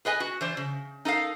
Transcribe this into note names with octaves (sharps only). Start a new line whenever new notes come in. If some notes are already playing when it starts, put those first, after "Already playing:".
G#4 B4 D#5 G#5
F#4
E3 C5 D5
C#3
D#4 A4 A#4 F5